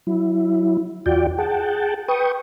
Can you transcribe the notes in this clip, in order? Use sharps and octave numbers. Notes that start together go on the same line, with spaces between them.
F#3 E4
E2 F4 F#4 D5 G5
G#4 F#5 G5 A5
B4 G5 C#6 D#6